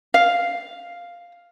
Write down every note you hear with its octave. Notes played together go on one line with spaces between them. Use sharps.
F5